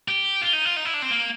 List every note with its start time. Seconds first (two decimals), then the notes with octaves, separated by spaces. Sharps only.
0.08 G4
0.42 F4
0.53 D#4
0.65 F4
0.77 D#4
0.85 E4
0.94 D4
1.02 C4
1.11 A#3